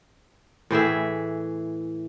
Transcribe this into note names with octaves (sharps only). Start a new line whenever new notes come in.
A2 E3 G#4 E5